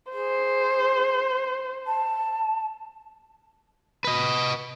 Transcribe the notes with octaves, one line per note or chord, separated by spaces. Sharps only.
G#4 C5
A5
B4 D#5